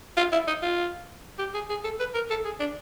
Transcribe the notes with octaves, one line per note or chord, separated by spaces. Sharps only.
F4
E4
D#4
F4
G4
G#4
G#4
A4
B4
A#4
A4
G#4
D4